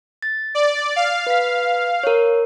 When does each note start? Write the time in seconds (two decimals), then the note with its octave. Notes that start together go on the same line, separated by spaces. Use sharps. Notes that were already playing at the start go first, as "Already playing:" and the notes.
0.22 A6
0.55 D5
0.96 F5
1.27 B4 B6
2.03 A#4 C#5